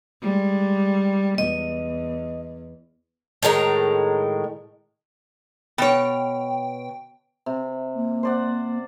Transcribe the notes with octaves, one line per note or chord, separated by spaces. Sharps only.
G3 G#3
E2 D#5
A2 D#3 G#3 A#5
B2 C#5 G5
C3
A#3
C5 D5 F#5